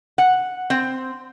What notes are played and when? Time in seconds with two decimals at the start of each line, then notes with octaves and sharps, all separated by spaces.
0.18 F#5
0.70 C4